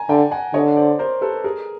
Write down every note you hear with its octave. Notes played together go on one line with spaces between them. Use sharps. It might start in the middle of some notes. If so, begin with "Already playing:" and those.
Already playing: G#5 A#5
D3 G5 A5
F#5 G#5
D3 C#5 D#5
C5 D5
A#4 C5
A4 B4
G#4 A#4